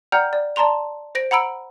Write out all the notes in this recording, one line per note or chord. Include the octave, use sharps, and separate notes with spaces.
D5 F#5 G5 A#5 F6 G6
D5
D5 A5 A#5 C6 F7
C5 A#6 D7
F#5 A#5 B5 E6 D7